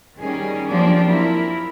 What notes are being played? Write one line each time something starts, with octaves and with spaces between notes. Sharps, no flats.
D#3 G3 C#4 G#4
F3 F#3 A#3 C4 D4 G4
E4 A#4